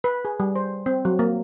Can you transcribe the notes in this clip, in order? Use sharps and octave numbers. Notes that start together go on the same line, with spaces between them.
B4
G#4
G3
C5
C4
F#3
A#3